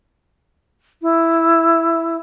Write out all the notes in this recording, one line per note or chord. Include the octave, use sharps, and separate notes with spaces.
E4